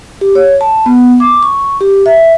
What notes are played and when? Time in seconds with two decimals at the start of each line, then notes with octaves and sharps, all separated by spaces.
0.21 G4
0.35 C#5
0.61 A5
0.86 B3
1.20 D6
1.43 C#6
1.81 G4
2.06 E5